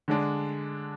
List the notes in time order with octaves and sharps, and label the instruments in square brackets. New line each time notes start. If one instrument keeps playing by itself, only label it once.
[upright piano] D3 G#3 D4